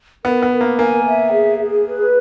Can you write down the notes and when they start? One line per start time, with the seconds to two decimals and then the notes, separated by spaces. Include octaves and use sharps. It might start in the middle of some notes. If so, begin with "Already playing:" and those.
0.25 B3 A#4
0.43 B3
0.51 A#4
0.61 A#3
0.78 A#3 G#5
1.06 E5
1.32 G#4
1.59 G#4
1.86 B4